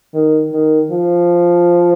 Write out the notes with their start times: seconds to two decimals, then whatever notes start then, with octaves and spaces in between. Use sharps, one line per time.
0.14 D#3
0.52 D#3
0.91 F3